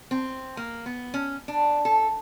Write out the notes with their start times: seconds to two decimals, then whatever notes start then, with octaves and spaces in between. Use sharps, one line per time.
0.11 C4
0.57 A#3
0.86 B3
1.14 C#4
1.48 D4
1.85 A4